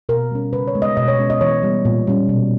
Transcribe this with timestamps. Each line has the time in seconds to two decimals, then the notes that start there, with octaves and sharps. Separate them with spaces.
0.09 B2 A#4
0.31 G3 C#4
0.53 C#3 B4
0.67 C#5
0.75 G#3 B3
0.82 D#5
0.97 B2 D#5
1.08 C#5
1.19 G#3 C#4
1.30 D#5
1.41 E3 C#5
1.63 G3 B3
1.85 A#2
2.07 G3 C#4
2.29 B2